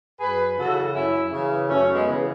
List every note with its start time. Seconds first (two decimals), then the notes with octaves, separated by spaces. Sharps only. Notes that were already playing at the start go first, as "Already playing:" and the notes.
0.20 F#2 G#4 B4
0.57 C#3 E3 F#4 A4
0.94 F#2 C#4 E4
1.31 C#3 E3
1.68 F#2 A3 C#4
1.93 G#3 B3
2.06 C#3 E3